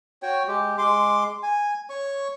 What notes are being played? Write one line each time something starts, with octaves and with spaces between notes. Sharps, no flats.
F#4 C#5 G5
G#3 G4
G#3 C6 D6
G#5
C#5 C#6